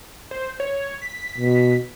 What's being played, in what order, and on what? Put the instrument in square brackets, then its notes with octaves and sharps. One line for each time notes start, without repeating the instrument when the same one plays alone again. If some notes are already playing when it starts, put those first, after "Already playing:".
[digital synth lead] C5
C#5
B6
[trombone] B2